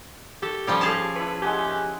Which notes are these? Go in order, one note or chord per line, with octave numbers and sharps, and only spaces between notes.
G4 A4
F3 G3 C#4 D6
G#4 A4 F5 A5
E4 B4 C#6
G#3 G4 F#5 G#5